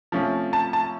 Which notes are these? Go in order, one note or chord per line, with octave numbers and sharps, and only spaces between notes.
C3 F3 A3 C#4
A5
A5